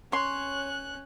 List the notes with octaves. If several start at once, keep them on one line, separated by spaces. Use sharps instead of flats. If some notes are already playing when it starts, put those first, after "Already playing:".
C#4 C#5 C6 F#6